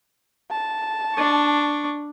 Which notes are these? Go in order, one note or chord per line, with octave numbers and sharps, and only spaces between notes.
A5
D4 C#6